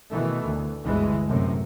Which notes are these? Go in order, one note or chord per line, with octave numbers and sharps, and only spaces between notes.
B2 D#3 E3 A3
D2
G1 D2 E3 G#3
F#2 A2 C3